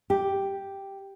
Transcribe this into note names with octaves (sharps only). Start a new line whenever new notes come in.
G4